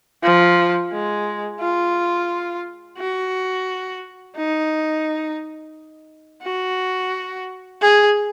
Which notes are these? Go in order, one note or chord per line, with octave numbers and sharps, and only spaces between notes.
F3
G#3
F4
F#4
D#4
F#4
G#4